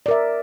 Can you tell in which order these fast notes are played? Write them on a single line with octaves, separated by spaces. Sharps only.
D5 A#4 E5